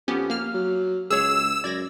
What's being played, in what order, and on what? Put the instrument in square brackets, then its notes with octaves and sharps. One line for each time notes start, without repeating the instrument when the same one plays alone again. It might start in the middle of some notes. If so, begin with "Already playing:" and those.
[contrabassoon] F2 [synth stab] B3 C#4 G4
[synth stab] A#3 F6
[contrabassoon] F#3
[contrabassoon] C#2 [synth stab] G#4 C#5 [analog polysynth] E6
[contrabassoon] F#2 [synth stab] D5 G#6 A#6